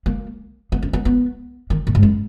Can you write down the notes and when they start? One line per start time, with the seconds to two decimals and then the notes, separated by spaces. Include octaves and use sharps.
0.06 A#3
0.72 B3
0.82 C#4
0.93 B3
1.05 B3
1.70 D#3
1.87 A#2
1.95 G#2
2.03 F#2